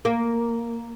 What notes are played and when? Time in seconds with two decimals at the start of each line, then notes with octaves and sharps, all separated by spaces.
0.05 A#3